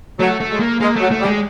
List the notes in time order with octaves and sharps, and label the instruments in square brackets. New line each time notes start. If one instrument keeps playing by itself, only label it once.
[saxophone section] F#3 [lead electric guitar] A3
[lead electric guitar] A3
[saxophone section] G#3
[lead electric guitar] A#3
[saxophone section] G#3 [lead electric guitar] A#3
[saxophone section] F#3 [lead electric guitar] A3
[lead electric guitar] A3
[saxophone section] G3
[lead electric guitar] G#3